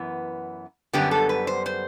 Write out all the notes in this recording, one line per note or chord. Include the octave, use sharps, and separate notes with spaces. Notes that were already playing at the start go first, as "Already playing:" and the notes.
Already playing: F#2 E3 B3
F#2 D3 G3 B3 G4
A4
B4
C5
C5